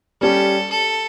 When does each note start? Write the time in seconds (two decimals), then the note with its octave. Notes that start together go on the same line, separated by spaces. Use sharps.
0.21 G3 C#4 G4 A4
0.70 A4